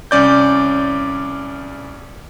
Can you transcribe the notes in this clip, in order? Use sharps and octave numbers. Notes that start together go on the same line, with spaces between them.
C2 C#4 D5 G6